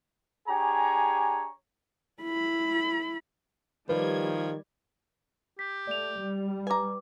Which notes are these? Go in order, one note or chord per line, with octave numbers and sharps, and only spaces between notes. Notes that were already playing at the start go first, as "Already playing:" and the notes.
D4 G4 G#4 C#5 G#5 A#5
E4 B5
D#3 F3 G3 B4 G#6
G4 B6
A3 D5 F7
G3
B4 G#5 A#5 D6